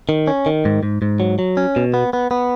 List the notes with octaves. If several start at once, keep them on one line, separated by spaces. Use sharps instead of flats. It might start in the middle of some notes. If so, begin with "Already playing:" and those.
D#3
C#4
D#3
G#2
G#2
G#2
F#3
F#3
C#4
B2
B3
B3
B3